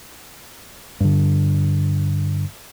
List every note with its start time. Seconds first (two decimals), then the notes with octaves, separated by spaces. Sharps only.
1.00 G2 D3